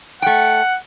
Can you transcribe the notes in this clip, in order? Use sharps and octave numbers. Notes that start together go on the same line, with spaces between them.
A3 F#5 G5